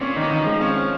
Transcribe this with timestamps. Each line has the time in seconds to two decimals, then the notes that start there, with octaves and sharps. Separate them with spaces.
0.01 A#2 C#4
0.17 B2 D#3
0.31 D#3
0.42 F3 G#3
0.61 F3 C#4
0.76 C#4